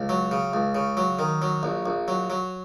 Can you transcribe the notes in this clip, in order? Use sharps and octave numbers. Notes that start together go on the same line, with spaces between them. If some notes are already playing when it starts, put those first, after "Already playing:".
Already playing: C#2
F#3
C#3
C#2
C#3
F#3
D#3
F#3
A#1
A#1
F#3
F#3